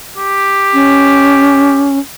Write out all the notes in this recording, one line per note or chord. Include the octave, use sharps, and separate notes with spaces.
G4
C#4